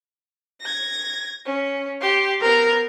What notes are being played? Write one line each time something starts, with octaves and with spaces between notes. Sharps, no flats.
G#6 A#6
C#4
G4 C6
B3 A#4 C5